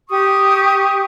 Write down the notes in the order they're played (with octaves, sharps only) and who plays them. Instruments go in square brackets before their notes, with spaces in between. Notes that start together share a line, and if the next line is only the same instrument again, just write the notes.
[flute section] G4 C#6 D#6